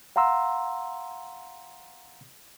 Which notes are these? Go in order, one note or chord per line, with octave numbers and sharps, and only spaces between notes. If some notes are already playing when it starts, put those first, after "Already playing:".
F5 F#5 A#5 C6 E6